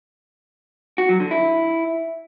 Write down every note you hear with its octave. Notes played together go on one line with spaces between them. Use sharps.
F#4
F#3
D3
E4